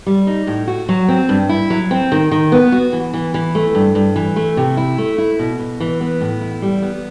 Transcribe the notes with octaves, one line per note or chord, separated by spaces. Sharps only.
G3
D#4
A2
F#4
F#3
C4
G2
E4
F#3
C4
D#3
D#3
B3
F#4
E3
E3
E3
A3
G2
G2
E3
A3
C3
E4
A3
E4
B2
B2
E3
B3
A2
E4
G3
B3